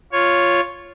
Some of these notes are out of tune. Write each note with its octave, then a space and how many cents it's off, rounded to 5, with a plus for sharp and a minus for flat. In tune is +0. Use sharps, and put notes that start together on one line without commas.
F4 +0 C#5 +0